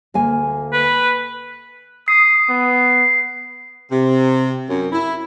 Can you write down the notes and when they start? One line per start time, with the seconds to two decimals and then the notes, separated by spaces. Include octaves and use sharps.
0.14 D2 A#3 G#5
0.73 B4
2.08 D#6 C7
2.49 B3
3.91 C3
4.70 F#2
4.92 E4